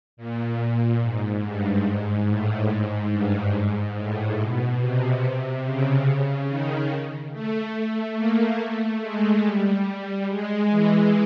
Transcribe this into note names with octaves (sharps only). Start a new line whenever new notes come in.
A#2
G#2
G2
G#2
A2
G#2
G2
G#2
A2
B2
C3
C#3
D#3
A3
A3
A#3
A3
G#3
G3
G#3
E3